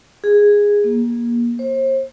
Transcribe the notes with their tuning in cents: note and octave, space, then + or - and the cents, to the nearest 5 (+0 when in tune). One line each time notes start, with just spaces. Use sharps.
G#4 -10
A#3 +25
C5 +35